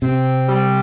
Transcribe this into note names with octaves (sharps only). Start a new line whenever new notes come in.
C3 C4
G3